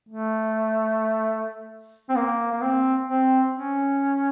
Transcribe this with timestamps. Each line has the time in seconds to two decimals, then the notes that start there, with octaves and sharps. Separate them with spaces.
0.09 A3
2.10 C4
2.16 A#3
2.52 A#3
2.62 C4
3.08 C4
3.54 C#4